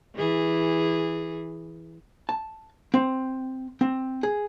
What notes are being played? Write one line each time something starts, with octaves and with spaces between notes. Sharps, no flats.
E3 G#4
A5
C4
C4
G#4